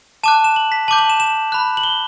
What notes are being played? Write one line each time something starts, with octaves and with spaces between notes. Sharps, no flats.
A5 D6 F#6 E7
E7
F#7
B6
A5 D6 G6 F#7
F#7
E7
E7
B5 F#6
F#7
G7